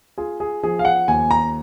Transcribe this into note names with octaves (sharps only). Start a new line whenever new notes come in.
F4 G#4
G#4
F3 G#4
F5
F#5
D#2 G#5
A#5